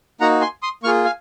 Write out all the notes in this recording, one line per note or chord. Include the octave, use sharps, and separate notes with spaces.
A#3 D#4 F#4 F#5 A#5
G#5 C6
C6 D#6
A#3 F4 G#4 C#6 F6
F5 G#5